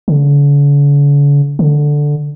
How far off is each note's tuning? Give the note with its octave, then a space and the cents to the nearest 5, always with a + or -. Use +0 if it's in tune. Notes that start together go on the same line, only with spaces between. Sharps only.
D3 -45
D3 +0